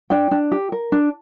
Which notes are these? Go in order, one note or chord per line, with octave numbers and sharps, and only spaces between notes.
D4 G5
D4
G4
A#4
D4